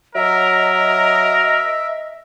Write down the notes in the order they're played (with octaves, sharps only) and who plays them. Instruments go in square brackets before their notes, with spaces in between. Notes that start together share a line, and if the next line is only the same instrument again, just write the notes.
[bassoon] F#3 [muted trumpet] A#4 [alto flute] D#5 [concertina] E5